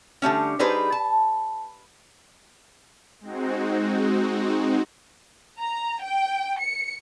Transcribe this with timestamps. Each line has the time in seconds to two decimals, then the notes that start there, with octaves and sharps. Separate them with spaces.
0.22 D3 G3 A3 C#4
0.59 G3 D#4 G#4 B4 C5
0.92 A5
3.21 G#3 C4 D#4 F#4
5.60 A#5
6.02 G5
6.60 C#7